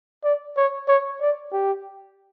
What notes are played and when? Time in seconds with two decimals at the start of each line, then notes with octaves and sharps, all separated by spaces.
0.24 D5
0.57 C#5
0.88 C#5
1.21 D5
1.53 G4